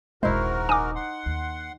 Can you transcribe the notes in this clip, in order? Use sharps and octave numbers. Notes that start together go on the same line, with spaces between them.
D#1 A#1 G#2 G#3 E4 F#4 A#4 C5
D#4 G#5 D6
F#5 C6
D#2